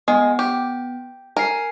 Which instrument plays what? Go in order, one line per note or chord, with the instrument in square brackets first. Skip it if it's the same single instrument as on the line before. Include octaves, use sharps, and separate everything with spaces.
[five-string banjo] G#3 [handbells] B3
[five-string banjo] G4
[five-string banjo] A#4 [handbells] G#5 C7